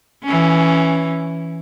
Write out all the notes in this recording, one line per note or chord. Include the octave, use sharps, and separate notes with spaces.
E3 C#4